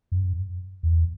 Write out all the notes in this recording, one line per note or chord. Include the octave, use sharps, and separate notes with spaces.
F#2
E2